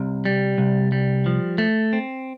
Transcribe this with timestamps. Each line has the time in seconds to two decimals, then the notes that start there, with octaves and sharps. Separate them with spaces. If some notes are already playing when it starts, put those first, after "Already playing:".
Already playing: C2 C3
0.25 G3
0.58 C2
0.92 G3
1.26 F3
1.58 A3
1.93 C4